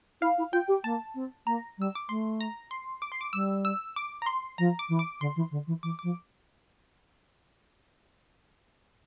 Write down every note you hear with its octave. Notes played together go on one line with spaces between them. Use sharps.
E4 F5
E4
F4 G5
G4
A#3 A5
C4
A#3 A#5
G3 E6
D6
A3 C6
A#5
C6
D6
C6
D6
G3 E6
E6
D6
A#5
C6
F3 A#5
D6
E3
D6
D3 C6
E3
D3
E3
E3 D6
F3 D6